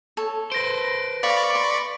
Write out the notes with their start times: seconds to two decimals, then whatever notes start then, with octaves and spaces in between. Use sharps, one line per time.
0.17 A4 C#5
0.52 B4 C5 A#6 D7
1.23 D5 F5 B5 C#6 D6
1.55 C6